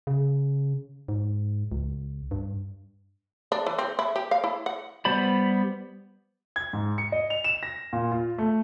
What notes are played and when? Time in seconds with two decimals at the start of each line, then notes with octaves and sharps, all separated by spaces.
0.07 C#3
1.08 G#2
1.72 C#2
2.31 G2
3.52 D4
3.67 E3
3.79 C4
3.99 E4
4.16 G4
4.31 F5
4.44 E4
4.66 F#5
5.05 G3 B3 C5 D5 B5
6.56 G#6
6.73 G#2
6.98 C#7
7.12 D#5
7.30 F7
7.44 E7
7.63 A#6
7.93 A#2
8.11 F4
8.38 A3